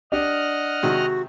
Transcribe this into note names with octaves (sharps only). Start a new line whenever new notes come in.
D4 G4 D#5 F#5 F6
C3 D#3 G#3 F#4